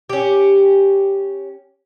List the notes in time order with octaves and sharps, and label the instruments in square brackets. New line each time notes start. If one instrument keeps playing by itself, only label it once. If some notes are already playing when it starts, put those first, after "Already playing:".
[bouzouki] C#4 G4